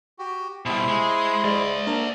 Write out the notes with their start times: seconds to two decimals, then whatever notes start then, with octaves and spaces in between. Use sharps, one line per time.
0.19 F#4 G4
0.66 B2 G3 E4 C5
0.88 G#3
1.44 G#3 D5 E5
1.87 A#3 D4 A#4